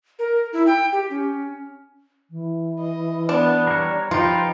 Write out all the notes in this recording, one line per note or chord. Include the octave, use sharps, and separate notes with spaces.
A#4
E4
G5
G4
C#4
E3
D#5
B3 D4
G3 A#4 C#5
F3 D#4 F4 G4 B4